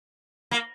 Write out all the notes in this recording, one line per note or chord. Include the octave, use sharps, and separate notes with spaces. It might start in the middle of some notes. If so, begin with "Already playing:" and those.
A#3